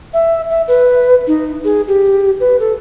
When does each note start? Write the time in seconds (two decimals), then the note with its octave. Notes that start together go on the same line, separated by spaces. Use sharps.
0.13 E5
0.50 E5
0.68 B4
1.27 D#4
1.65 G#4
1.88 G4
2.40 B4
2.60 A4